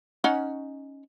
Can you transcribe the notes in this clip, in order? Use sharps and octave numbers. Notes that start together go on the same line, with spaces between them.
C#4 D#4 F#5